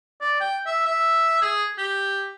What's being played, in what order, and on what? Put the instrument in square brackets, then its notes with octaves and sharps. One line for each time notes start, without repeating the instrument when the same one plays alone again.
[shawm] D5
G5
E5
E5
G#4
G4